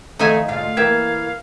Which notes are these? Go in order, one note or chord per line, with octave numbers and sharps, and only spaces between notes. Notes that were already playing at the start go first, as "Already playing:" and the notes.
F2 D#3 A3 D#4 E5 F5 G#5
D2 G#2 F4 F5
E3 A#3 G4 A#4 E5 G#6